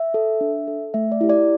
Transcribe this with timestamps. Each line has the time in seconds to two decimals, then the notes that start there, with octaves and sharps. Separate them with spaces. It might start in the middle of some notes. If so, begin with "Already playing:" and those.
Already playing: E5
0.14 A4
0.41 D4
0.67 A4
0.94 A3 E5
1.12 D5
1.21 E4 G4
1.29 D5